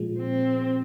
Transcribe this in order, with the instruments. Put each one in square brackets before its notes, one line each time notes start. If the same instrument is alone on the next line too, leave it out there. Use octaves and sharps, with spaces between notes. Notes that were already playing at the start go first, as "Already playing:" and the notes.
Already playing: [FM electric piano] A#2 F3 G#3
[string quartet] C4